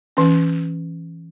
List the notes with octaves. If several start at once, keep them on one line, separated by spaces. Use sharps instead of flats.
E3 C#4